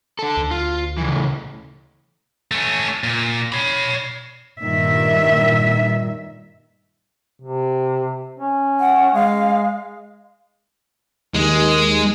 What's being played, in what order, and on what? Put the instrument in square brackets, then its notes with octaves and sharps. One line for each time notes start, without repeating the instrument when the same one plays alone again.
[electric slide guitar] D3 A4
[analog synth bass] D2
[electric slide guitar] F4
C#3 E3
[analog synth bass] A2
[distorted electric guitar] A3 C#4
A#2
C#5 B5
[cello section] G2 A#2 D#3 E5
[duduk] C3
C#4
[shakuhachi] F#5
[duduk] G#3 [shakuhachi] F5
[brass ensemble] D#2 [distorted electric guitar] G#3